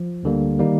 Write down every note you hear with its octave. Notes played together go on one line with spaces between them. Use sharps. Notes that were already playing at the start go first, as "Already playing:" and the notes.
Already playing: F3
D2 D3 G3 A#3
D#3 G3 A#3 D#4